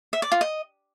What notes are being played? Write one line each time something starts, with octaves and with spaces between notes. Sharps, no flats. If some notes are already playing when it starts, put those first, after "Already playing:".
E5
D5
F4
D#5